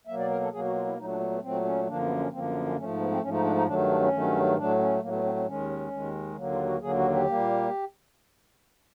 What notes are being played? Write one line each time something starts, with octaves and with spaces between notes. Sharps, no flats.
B2 F#3 A#3 E5
D5
A#4
A4
B2 F#3 A#3 G#4
F#4
F4
E4
A#2 F#3 A3 D#4
D4
B3
B3
A#2 F#3 A3 C4
C#4
F#2 D3 F3 A#3 D4
B3
C#4
F#2 D3 F3 A#3 C4
B3
B3
C#4
G#2 F3 A3 C#4
B3
C4
G#2 F3 A3 C#4
D#4
D4
D#4
G2 D#3 F#3 A3 D4
D4
C#4
G2 D#3 F#3 A3
A2 F#3 A3 D4
C#4
A2 F#3 A3 A#3
B3
C4
C4
D#2 D#3 G#3 C#4
D#2 D#3 G#3
D#2 D3 F#3 A#3
F4
F#4
D#2 D3 F#3 A#3 G#4
F#4
G4
A#2 G3 A#3